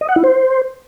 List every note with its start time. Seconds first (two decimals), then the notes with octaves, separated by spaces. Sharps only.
0.01 D#5
0.09 F#5
0.16 E4
0.24 C5